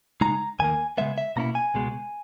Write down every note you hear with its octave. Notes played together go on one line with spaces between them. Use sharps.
C#3 G#3 D#4 A#5
D#2 D#3 A#3 G#5
C#3 G#3 B3 E5
E5
B2 A#3 C#4 E4 A#5
G#5
C#2 B2 G#3